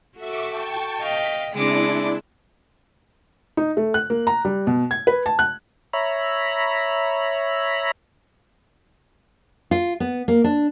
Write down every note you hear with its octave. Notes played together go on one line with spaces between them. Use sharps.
F#4 A4 E5 C#6 D6
G5 A5 C#6
D#5 F5 G5 B6
C#3 G#3 C4 D4 E4 D5 D6
D#4
A3
F#6
A#3
A#5
G3
B2
G#6
B4
A5
F#6
C#5 E5 A#5 B5
F4
B3
A#3
D4